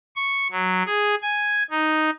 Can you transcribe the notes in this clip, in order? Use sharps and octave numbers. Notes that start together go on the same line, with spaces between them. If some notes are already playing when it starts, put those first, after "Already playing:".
C#6
F#3
G#4
G#5
D#4